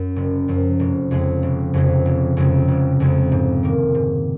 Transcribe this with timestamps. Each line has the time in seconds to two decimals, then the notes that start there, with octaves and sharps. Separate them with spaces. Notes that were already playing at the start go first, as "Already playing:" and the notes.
Already playing: F#2
0.16 F#1
0.48 F#2 F3
0.80 F1
1.11 F2 C#3 G#3 C4
1.43 F1
1.74 F2 C#3 G#3 C4
2.06 F1
2.37 F2 C#3 G#3 C4
2.68 F1
3.00 F2 C#3 G#3 C4
3.32 G#2
3.63 D#3 A#3
3.95 G#2